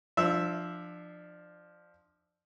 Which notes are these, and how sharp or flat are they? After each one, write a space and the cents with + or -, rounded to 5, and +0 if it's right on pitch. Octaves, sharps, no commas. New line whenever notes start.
F3 +0 D4 +30 E5 +0